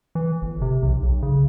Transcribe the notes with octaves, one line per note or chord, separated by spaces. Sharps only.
E3
G1
C3
B1
B1
C#3